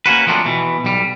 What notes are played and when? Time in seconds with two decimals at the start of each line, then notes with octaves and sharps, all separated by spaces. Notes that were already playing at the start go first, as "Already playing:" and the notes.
0.06 A#3 C#4 F#4 B4
0.27 F3 F#3 A3 C4 D4
0.46 B2 E3
0.84 B1 G3